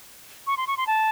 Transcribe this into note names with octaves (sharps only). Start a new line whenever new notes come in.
C#6
C6
C#6
C6
A5